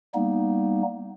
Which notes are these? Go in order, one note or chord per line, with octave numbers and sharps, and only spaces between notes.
G3 A#3 B3 D#4